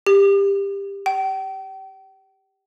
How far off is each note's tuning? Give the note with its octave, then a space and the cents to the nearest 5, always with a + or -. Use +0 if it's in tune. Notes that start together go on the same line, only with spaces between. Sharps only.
G4 +20
G5 -40